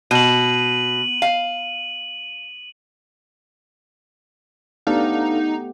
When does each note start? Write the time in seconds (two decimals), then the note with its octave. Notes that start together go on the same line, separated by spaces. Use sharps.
0.11 B2 D#7 F#7
1.22 F5
4.87 A3 B3 D4 D#4 G4 A4 F5